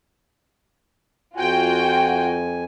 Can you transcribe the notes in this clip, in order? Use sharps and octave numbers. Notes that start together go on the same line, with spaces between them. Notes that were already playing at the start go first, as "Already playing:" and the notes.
F2 F4 F#4 G5 G#5